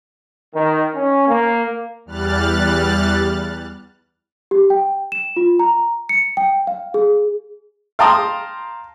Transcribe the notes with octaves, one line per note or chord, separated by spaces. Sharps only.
D#3
C#4
A#3
E2 G3 F6 F#6 A6
G4
G5
E7
F4
A#5
C#7
G5
F5
G#4
F5 G5 A5 A#5 C6 D#6